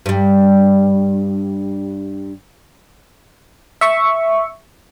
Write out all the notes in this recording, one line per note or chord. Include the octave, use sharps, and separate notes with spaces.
G2 G3
E5 C#6